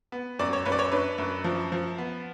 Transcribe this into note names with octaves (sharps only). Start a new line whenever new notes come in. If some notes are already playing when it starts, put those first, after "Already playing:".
B3
F#2 D5
C#5
F#2 B4
D5
C#5
D4 B4
F#2
F3
F3
B3